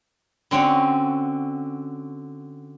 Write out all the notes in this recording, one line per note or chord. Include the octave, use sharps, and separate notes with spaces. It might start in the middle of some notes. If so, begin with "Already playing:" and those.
D3 C4 C#4 F#4